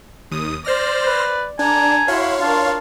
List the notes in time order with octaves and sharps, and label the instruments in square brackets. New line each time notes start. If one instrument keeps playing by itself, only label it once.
[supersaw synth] D#2 D#6
[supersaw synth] C5 F6 A#6 [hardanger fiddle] D5
[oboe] B4
[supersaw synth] D4 [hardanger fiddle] A4 A#5 [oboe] G#5
[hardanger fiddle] E4 F#4 [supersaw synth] C#5 F5 C6
[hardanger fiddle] D4 A#4 [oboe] F4